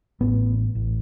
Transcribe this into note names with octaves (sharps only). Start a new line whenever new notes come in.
A1 A2 B3
A1